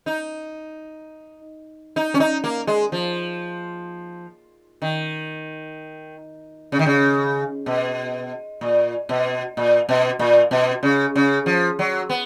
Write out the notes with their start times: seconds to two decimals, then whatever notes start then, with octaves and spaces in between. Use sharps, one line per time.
0.06 D#4
1.96 D#4
2.14 C#4
2.20 D#4
2.44 A#3
2.67 G#3
2.92 F3
4.82 D#3
6.72 C#3
6.79 D#3
6.86 C#3
7.66 B2
8.61 A#2
9.09 B2
9.57 A#2
9.89 B2
10.19 A#2
10.51 B2
10.83 C#3
11.16 C#3
11.46 F3
11.79 F#3
12.09 B3